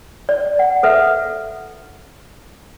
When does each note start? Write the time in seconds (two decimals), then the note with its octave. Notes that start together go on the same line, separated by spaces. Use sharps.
0.29 D5
0.59 F#5
0.83 A4 B4 E5 F#5